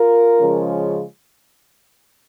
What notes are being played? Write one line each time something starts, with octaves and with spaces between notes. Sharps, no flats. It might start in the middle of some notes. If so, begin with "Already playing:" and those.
Already playing: F4 A#4
C#3 F3 G#3 C#4